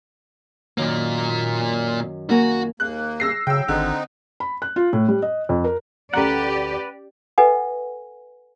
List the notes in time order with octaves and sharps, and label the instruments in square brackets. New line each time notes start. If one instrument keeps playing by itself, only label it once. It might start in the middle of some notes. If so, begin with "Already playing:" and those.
[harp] F#2 D#3 [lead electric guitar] A#2 A#3
[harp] A#3 A#4 G#5 [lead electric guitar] F#4
[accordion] D#2 A#3 [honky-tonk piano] F#6
[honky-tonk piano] E6 A#6 C7
[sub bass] C#3 [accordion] F#3 [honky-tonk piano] G5 E6
[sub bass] G#1 [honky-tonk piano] D3 [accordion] C4 D#4
[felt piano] B5
F#6
F4
A2
G3
D#5
F2
A#4
[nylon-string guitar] D2 A4 [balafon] C#4 A#5 [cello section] G4 D5 [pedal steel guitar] B4 F#5
[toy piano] A4 B4 D#5 F#5 G#5